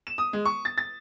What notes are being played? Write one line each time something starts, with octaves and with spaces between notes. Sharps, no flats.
E7
D#6
G#3
C#6
A6
A6